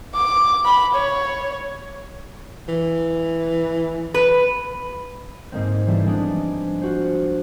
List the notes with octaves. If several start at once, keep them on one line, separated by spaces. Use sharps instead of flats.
D6
B5
C#5
E3
B4
G#2 G#3 A#3 C4
E3 G3 A3 E4 C5
F3 G#3 B3 C4 D4 D#4
F4 F#4 C5